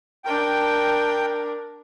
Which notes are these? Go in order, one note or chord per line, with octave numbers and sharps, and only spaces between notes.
D4 A#4 G5